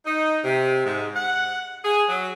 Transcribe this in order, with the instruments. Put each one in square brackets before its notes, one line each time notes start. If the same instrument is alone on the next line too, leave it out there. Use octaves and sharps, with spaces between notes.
[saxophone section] D#4
C3
G#2
F#5
G#4
F#3